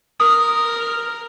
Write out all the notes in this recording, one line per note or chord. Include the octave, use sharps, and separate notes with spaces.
A#4 D#6